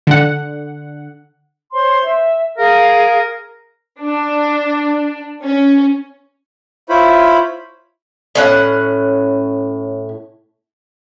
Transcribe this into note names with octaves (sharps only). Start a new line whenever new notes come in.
D3 F#5
C5 C#5 C6
E5
G#4 A#4 F5
D4
C#4
E4 F4 C5 C#5 B5
A2 C#4 F#5